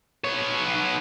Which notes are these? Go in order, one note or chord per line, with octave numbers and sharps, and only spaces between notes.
B3 C#5